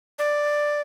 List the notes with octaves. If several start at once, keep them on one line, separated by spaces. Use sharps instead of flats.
D5